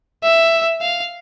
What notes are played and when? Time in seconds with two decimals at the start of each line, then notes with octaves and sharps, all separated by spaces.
0.23 E5
0.81 F5